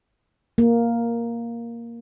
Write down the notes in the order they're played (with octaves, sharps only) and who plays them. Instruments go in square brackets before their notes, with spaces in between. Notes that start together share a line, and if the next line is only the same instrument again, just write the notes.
[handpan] A#3